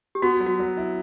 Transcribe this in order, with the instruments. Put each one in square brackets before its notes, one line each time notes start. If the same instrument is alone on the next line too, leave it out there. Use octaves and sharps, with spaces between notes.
[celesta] G4
[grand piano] B3 [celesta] F#4
[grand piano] F#3
[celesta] F#4
[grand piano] F#3
E4